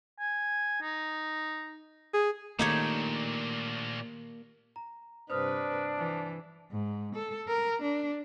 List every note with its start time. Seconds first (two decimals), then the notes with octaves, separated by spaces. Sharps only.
0.20 G#5
0.82 D#4
2.14 G#4
2.59 A#2 D#3 A3 A#3 D4 D#4 G4 C#5
4.76 A#5
5.30 G2 C3 D4 B4 C5 D#6 F6
5.97 E3
6.72 G#2
7.16 A4
7.48 A#4
7.82 D4